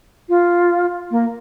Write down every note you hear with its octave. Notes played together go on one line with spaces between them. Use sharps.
F4
A#3